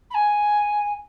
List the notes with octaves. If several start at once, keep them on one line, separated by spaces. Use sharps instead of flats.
B5
G#5